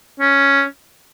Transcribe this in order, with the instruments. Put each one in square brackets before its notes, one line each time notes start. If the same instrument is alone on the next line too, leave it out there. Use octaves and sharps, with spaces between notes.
[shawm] C#4